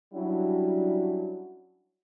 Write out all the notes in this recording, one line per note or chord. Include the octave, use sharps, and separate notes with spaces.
F#3 G3 C#4 D4 E4 F#4